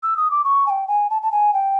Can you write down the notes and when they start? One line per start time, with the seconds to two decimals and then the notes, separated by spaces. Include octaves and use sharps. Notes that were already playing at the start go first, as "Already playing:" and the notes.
0.03 E6
0.17 D#6
0.31 D6
0.44 C#6
0.66 G#5
0.70 G5
0.88 G#5
1.10 A5
1.22 A5
1.32 G#5
1.54 G5